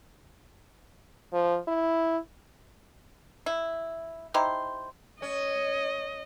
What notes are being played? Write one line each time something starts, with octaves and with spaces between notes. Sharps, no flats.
F3
E4
E4
D#4 E4 G4 C5
C#4 D#5